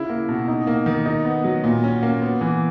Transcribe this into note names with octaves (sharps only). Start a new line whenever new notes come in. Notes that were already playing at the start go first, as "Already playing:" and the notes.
Already playing: C#3 E4
A#3
B2
D#4
A#3
D#3
D#4
B3
F#3
A#2
C#4
A#3
B3
E3